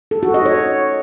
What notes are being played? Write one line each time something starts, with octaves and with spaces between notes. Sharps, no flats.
A4
F#4
D#5
C#5